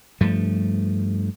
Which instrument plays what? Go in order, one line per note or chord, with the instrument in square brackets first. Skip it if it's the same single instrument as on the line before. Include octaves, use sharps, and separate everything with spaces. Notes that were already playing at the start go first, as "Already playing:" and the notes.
[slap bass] G2 F3 A3